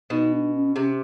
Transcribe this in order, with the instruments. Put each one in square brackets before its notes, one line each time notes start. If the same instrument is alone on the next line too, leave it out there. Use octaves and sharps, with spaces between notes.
[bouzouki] B2 [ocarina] D#4
[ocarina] D4
C#4
[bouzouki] C3 [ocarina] C#4